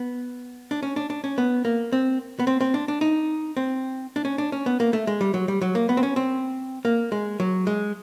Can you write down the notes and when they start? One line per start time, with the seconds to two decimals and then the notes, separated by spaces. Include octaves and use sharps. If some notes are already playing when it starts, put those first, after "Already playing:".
Already playing: B3
0.71 D4
0.83 C#4
0.96 D4
1.10 D4
1.24 C#4
1.38 B3
1.65 A#3
1.93 C4
2.39 B3
2.47 C4
2.61 C4
2.74 D4
2.88 D4
3.01 D#4
3.57 C4
4.16 D4
4.25 C#4
4.38 D4
4.52 C#4
4.66 B3
4.80 A#3
4.93 A3
5.07 G#3
5.21 G3
5.34 F#3
5.48 G3
5.61 F#3
5.75 A#3
5.89 B3
5.97 C4
6.03 C#4
6.16 C4
6.85 A#3
7.12 G#3
7.40 F#3
7.67 G#3